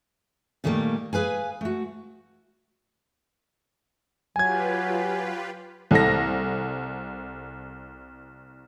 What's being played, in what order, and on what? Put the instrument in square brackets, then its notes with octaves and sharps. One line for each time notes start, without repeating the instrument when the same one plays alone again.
[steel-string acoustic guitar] A#2 D#3 G3 A3 A#3
G#4 B4 F5 G#5
A3 F#4
[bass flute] F#3 [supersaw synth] F4 G4 B4 [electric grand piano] G#5 G#6
[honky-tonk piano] C2 A4 A#6